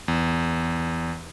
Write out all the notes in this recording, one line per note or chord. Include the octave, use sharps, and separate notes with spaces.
E2